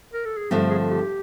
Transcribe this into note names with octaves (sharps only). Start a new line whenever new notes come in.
A#4
A4
G#4
G2 D3 F3 A3 C4 G4
G#4
G4